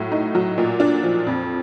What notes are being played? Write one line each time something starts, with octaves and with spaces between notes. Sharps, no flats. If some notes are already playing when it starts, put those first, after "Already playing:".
Already playing: A2 F#3
D#4
F#3
A#2
D4
F3
F2